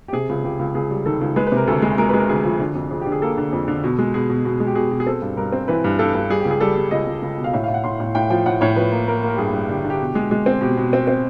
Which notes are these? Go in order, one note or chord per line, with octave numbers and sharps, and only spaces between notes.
G4
C3 G#4
C#2
C#2 G4
C#2
C#2 G#4
G3
D#3 A4
C#2
G#3 B4
B4
C3
A#4
D2 A4
G#3
G#3 A#4
G#3 B4
A#4
D2 G#4
F3
D3
F2
F2 G#4
D3 G4
G#4
A#3 A4
D3
F2
D3
B2
G#3
B2 G#4
B2
B2
G#3
G4
B2 G#4
B2
G#4
C4 A4
G2
G2 A#4
C4
E3 B4
G2
G2 A4
G2
G3 G#4
C#2 G4
G#4
G3 A4
G3
C#2 D#5
C#2
C#2
B2
F5
A2 E5
A2 F5
F#5
A2 C6
A2
A2 G5
F3 G5
A2 F#5
A2 C#5
F3 B4
A#3
A#3 A#4
A#3
A#4
G4
G2 G#4
G2
D3 G4
D3
G4
B2
G#3
G#3
C4
B2 G4
B2
C4
C4